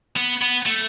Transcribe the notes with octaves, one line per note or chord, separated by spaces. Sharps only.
B3
B3
A3